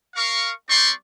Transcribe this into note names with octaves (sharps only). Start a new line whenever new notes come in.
A#4 F5 C#6
G3 C4 G4 D5 C6 C#6